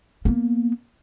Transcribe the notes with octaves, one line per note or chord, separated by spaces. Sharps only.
A#3 B3